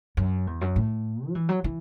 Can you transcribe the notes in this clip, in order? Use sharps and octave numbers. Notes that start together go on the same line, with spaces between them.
F#2
E2
F#2
A2
F#3
E3
F#3
E3